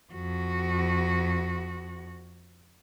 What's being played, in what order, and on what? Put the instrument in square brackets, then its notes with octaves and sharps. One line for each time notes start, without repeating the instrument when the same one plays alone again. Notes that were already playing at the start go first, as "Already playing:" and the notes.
[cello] F2 F#4